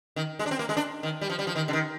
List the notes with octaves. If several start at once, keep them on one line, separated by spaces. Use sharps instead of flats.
D#3
G#3
D4
C4
A#3
G#3
D4
D#3
G3
F3
G3
F3
D#3
D3
D#3